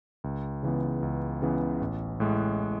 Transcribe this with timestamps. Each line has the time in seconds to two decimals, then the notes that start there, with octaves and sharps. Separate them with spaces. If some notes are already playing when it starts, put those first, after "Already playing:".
0.24 C#2
0.63 C#3 E3 B3
1.03 C#2
1.42 C#3 E3 B3
1.81 A1
2.20 A2 G#3